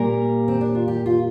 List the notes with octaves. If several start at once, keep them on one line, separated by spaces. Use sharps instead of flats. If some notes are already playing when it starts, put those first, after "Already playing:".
Already playing: A#2 G3 A#3 A#4
C4
D4
F4
G4
F4